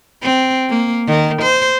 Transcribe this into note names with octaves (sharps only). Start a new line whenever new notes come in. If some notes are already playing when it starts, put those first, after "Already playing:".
C4
A#3
D#3
C5